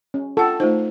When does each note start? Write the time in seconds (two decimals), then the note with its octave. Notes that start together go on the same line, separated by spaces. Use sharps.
0.14 C#4
0.37 F4 A4 F#5 G5
0.60 A3 D#4 F4 C5